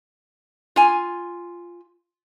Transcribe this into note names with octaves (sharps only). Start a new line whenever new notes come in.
F4 G#5